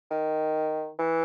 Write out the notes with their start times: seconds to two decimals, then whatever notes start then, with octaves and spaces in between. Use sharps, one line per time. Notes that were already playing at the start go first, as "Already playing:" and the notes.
0.11 D#3
0.99 E3